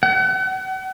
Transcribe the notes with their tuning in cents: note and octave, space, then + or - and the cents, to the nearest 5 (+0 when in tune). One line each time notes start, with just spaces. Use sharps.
F#5 +40